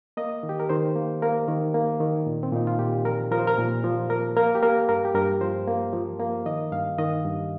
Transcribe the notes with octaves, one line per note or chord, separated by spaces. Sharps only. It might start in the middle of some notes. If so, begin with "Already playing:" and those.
A#3 D#5
D#3
G4
A#4
D#3 C5
A#3
A#3 A#4
D#3
A#3
D#3
A#2
C4
A#2 D#4
F4
A#2 G4
F3 A#4
F3 A#4
C5
A#4
A#2
F3
A#3 A#4
A#3 A#4
G4
A#3 A#4
G2 A#4
G4
G2 A#4
F3 C5
A#3
F3
A#3
D#3 D#5
G2 F5
D#3 D#5
G2